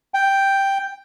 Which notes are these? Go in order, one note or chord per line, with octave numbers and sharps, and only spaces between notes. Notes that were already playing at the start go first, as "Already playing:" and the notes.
G5